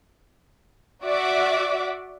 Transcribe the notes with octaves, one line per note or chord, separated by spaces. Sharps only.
F#4 D5 E5 F#5 D6